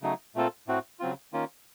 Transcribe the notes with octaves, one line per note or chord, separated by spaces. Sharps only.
C#3 F#3 A3 D#4
A#2 A3 C4 F4 A4
A2 A3 C4 F#4
C#3 F#3 C4 F4
D#3 A#3 C#4 F4